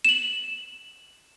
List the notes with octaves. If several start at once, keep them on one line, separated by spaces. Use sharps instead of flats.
E7 F#7